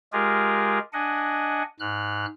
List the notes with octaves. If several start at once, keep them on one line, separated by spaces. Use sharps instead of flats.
G#3 F4 G4 G#4 A#4
D4 D#5 F#5 G#5
G#2 F6 F#6